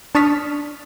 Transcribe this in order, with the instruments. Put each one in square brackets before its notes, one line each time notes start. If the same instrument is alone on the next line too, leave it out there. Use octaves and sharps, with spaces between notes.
[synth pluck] D4 A5 C#6 D#6 F6 B6